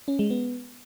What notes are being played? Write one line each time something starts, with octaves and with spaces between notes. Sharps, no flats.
C#4
G#3
B3